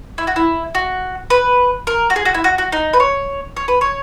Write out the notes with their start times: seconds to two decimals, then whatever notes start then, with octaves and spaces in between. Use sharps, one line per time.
0.18 E4
0.27 F#4
0.36 E4
0.75 F#4
1.30 B4
1.87 A#4
2.10 F#4
2.16 G#4
2.25 F#4
2.34 E4
2.44 F#4
2.58 F#4
2.72 D#4
2.93 B4
3.00 C#5
3.57 C#5
3.68 B4
3.81 C#5